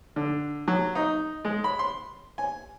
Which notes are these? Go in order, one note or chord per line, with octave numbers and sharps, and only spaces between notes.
D3
F#3
D#4
G#3
B5
C6
G#5